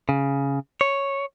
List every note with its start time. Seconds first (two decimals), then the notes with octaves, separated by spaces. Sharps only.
0.09 C#3
0.81 C#5